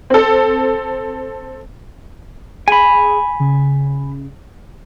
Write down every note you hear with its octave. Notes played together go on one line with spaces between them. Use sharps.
C4 A4
G#4 G#5 B5
C#3